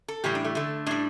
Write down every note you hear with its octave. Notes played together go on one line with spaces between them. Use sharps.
A4
A2 E3 G3 G4
D4
A3
D3 A3
A2 G3 D4